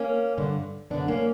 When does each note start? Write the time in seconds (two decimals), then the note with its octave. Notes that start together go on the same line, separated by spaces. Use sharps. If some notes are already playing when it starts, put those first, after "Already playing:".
Already playing: A#3 C#4
0.38 G2 D3
0.90 F#2 D3 B3 D4
1.08 A#3 C#4